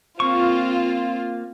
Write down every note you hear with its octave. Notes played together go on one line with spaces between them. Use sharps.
A#3 C4 F4 C#6